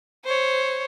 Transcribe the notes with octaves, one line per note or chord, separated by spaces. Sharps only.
C5 C#5